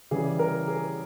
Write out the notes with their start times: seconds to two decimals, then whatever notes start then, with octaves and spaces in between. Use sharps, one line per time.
0.11 C#3 E3 G3 G#4
0.39 A#4
0.68 G#4